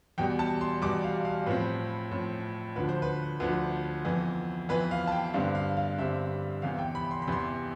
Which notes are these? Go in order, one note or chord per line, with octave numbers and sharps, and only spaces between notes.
E2 B2 G3 G5
A5
C6
E2 B2 G3 D6
F5
F5
A2 F3 C4 B4
A2 F3 C4
D2 D3 F3 B4
C5
B4
D2 D3 F3 B4
F2 E3 B3
F2 E3 B3 B4
F5
A5
G5
G2 D3 G3 C4 F5
F5
F5
G2 D3 G3 C4 E5
E2 C3 E3 F5
G5
B5
C6
B5
E2 C3 E3 C6